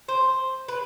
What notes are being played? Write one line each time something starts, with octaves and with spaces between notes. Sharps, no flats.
C5
B4